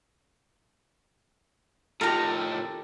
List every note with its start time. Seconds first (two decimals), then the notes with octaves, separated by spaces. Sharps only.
2.01 A2 D#3 F4 G4 A4 A#4 A#5